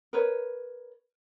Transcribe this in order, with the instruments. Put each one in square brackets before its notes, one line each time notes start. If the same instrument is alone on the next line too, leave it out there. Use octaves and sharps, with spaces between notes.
[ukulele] A#4 B4 C#5